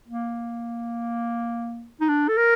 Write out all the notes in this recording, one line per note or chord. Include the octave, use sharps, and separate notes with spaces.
A#3
D#4
D4
A4
A#4